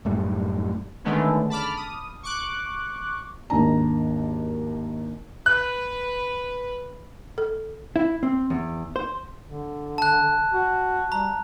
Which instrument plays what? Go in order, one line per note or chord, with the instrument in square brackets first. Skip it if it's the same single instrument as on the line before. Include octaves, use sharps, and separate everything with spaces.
[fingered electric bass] F#2 A2 G3
[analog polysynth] D3 D#3 G#3 A3 B3 C#4
A5 B5 D6 F6
D#6
C#6 D6 F#6
[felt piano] G#1 D#2 D4 A5 A#5
[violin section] B4 [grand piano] F#6
[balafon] A4
[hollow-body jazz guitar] E4
C4
E2
C5
[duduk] D3
[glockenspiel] A5 F#6
[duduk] F#4
[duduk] G3 [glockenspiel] A#5